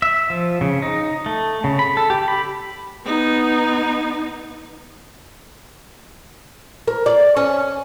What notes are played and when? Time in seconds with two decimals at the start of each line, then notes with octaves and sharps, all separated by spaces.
0.02 E5
0.30 F3
0.61 C#3
0.82 D#4
1.26 A3
1.64 C#3
1.79 B5
1.97 A4
2.10 G4
2.28 B5
3.06 B3 D#4
6.88 A#4
7.06 D5
7.37 C#4